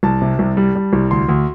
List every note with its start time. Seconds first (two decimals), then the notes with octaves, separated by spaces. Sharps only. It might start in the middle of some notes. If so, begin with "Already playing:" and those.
0.03 C2 A5
0.22 C3
0.39 C2
0.57 G3
0.75 G3
0.93 C2
1.11 D2 C6
1.29 D2